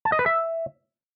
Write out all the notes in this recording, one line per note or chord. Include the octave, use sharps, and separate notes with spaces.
A5
D#5
B4
E5